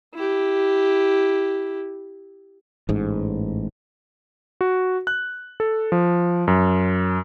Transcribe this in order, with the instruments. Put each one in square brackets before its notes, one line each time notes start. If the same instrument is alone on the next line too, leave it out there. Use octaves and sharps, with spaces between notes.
[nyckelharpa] E4 G4
[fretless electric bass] A1 G#2
[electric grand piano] F#4
F#6
A4
F3
F#2